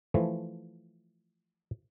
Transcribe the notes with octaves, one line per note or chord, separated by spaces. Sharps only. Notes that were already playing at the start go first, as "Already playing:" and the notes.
E3 F3 A3